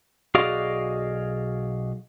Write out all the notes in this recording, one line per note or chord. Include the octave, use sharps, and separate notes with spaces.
B1 F#4 G#4 D5 D#5 F5